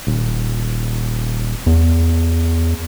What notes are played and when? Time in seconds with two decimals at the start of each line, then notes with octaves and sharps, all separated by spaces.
0.07 D#1
1.66 E2